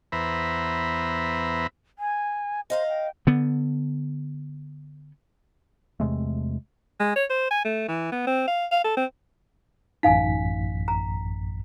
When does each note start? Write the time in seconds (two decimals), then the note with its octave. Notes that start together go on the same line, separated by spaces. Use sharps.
0.12 E2 B3 C5 E5 A#5 B5
1.99 G#5
2.70 C5 D#5 F5 A#5
2.88 G5
3.27 D3 B3
6.00 E2 C3 G#3 A3
7.00 G#3
7.16 C#5
7.30 C5
7.50 G#5
7.65 A3
7.88 E3
8.12 B3
8.27 C4
8.48 F5
8.72 F5
8.84 A4
8.97 C4
10.03 A1 F#2 D#4 F5 G#5 B6
10.88 A#5